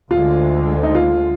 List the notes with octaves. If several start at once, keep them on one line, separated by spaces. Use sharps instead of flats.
D2 D3 G#3 F4
D#4
F4